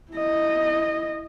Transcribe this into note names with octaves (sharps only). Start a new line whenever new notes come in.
E4 D#5